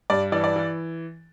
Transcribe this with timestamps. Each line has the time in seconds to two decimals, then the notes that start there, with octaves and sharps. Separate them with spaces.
0.10 G2 D5
0.32 E3 D5
0.44 D5
0.56 E3